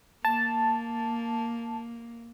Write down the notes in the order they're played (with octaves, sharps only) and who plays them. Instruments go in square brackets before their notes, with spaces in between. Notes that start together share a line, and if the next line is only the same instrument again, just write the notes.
[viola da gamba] A#3 [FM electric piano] A5